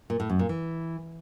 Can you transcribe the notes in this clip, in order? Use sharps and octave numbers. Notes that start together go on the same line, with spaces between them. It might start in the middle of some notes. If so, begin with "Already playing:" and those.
A#2
A2
F#2
A#2
E3